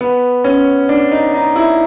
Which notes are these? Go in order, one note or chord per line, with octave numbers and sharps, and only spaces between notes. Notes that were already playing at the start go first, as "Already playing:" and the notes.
B3
C#4
D4
D#4
D#4
E4